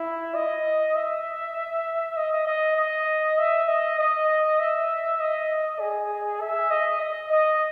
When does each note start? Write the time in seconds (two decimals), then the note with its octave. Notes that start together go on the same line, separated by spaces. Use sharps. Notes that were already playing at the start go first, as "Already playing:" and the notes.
Already playing: E4
0.35 D#5
0.96 E5
2.17 D#5
2.47 D#5
2.77 D#5
3.38 E5
3.68 D#5
3.99 D#5
4.60 E5
5.20 D#5
5.80 G#4
6.41 E5
6.71 D#5
7.01 D#5
7.32 D#5